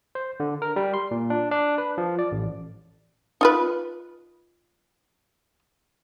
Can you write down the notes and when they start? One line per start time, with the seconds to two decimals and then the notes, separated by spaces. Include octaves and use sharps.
0.15 C5
0.40 D3
0.62 A#4
0.76 G3
0.94 C6
1.11 A#2
1.30 D4
1.51 D4
1.78 B4
1.98 F3
2.19 D5
2.32 A1
3.41 D#4 F4 B4